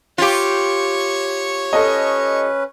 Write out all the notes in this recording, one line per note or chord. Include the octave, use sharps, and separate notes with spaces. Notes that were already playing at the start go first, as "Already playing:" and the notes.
F4 G4 C#5 C#6
C#4 A4 B4 D#5